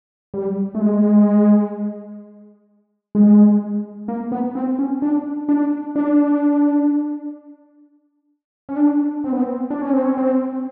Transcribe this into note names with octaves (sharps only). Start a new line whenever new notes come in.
G3
A3
G#3
G#3
A#3
B3
C4
C#4
D4
D4
D4
C#4
D4
C4
B3
C4
D4
C#4
C4
C#4
C4